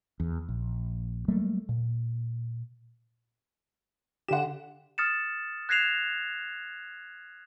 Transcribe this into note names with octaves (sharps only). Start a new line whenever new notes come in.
E2
A#1
F#3 G3 A3 A#3
A#2
D3 G4 F#5 E7
D#6 F6 A6 C#7 E7
F#6 G#6 A#6 C7 E7 F7